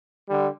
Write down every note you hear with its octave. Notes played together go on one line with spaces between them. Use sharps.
D3 G3